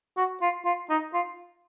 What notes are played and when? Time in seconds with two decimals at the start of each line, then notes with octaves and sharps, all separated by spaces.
0.17 F#4
0.42 F4
0.65 F4
0.90 D#4
1.14 F4